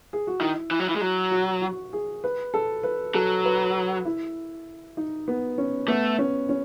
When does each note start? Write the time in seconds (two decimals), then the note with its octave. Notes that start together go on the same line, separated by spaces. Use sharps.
0.13 G#4
0.27 F#4
0.41 D#3 E4
0.71 E3
0.80 F#3
0.89 E3
0.96 G#3
1.01 F#3
1.31 F#4
1.62 F#4
1.93 G#4
2.24 B4
2.54 A4
2.83 B4
3.14 F#3 A4
3.45 B4
4.05 E4
4.97 D#4
5.28 B3
5.58 C#4
5.88 A3 B3
6.18 C#4
6.49 C#4